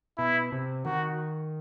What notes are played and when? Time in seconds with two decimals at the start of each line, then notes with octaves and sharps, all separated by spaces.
0.18 B2 E4
0.52 C3
0.85 D#3 F#4